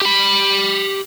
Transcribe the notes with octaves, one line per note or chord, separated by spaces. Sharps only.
G4 B5